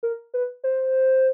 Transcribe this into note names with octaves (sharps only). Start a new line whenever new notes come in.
A#4
B4
C5